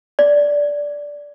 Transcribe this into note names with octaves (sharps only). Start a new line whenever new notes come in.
D5